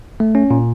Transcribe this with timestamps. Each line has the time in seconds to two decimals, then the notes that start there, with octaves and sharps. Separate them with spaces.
0.20 A3
0.35 C#4
0.51 A#2